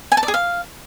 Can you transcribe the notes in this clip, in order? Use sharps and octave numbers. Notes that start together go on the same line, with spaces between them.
G#5
A5
D5
G#4
F5